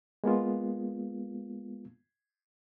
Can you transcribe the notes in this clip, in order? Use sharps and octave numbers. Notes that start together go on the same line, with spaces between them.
G#3 A#3 B3 F4